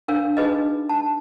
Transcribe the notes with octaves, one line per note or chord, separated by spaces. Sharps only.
D4 A#4 C#5 F5
D4 D#4 F#4 G#4 B4 D#5
A5